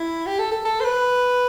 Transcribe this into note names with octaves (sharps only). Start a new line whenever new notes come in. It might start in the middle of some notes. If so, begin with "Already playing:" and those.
Already playing: E4
G4
A4
A4
A4
C5
B4